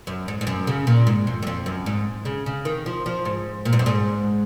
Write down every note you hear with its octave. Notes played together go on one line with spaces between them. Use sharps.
F#2
G#2
G#2
F#2
C#3
A#2
G#2
F2
F#2
F2
F#2
G#2
C#3
C#3
D#3
F3
F3
G#2
A#2
G#2
F#2
G#2